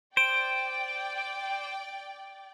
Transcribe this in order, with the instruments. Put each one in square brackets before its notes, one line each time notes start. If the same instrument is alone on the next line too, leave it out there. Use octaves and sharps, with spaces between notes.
[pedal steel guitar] C5 [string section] D5 G5 [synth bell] D7